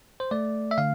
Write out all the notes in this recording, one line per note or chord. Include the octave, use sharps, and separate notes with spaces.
C5
A3 D5
E5
D3 F5